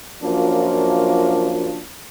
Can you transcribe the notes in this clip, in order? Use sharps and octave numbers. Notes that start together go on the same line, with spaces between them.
F#2 F3 F#3 A#3 D4 F4